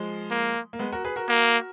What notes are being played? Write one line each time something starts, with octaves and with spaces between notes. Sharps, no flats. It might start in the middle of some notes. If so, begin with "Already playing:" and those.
Already playing: F3 G#3
A#3
A#3
G#3 B3
F#4 A#4
G#4 B4
F#4 A#4
A#3